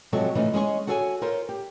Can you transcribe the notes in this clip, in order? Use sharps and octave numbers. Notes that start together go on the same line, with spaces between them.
C3 F3 F#3 G#3 A4 C#5
C#3 E3 F3 A3 C#4 D#4
G#3 C#4 G#4 C#5
F#4 G#4 A4 C#5 D#5 G#5
F4 A#4 C5 C#5
G4